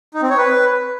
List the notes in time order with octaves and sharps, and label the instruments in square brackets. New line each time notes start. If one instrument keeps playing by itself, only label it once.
[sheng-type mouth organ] D#4
C4
C#5
B4